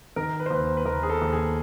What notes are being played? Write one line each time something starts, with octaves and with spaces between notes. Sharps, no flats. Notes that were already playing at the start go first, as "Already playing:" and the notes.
D#3 A#4
B4
C5
D#2 B4
B4
D#2 A#4
G#4
A4
D#2
G#4